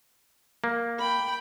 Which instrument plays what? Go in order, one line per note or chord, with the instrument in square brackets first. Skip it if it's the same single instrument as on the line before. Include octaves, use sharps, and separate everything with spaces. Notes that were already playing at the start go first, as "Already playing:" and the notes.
[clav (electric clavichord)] A#3
[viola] G5 B5